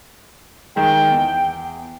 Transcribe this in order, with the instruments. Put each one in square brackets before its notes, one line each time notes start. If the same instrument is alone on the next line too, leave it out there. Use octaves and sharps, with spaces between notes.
[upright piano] D#3 G#3 [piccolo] G5
[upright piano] E2